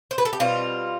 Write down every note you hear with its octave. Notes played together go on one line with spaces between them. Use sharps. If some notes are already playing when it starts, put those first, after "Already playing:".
C5
B4
A4
G4
B2 G3 C4 F4